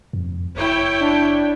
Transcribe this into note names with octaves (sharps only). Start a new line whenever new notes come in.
F2
F#1 E4 C#5 G5
D4